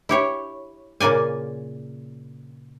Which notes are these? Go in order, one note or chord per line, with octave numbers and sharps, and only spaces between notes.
E4 G4 C#5
A#2 C#3 A#3 D5 G#5